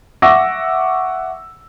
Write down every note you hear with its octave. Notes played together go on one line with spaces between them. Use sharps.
E5 F#5 C#6 D6 E6 A#6